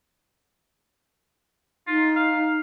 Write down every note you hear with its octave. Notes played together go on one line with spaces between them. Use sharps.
D#4 F4
F5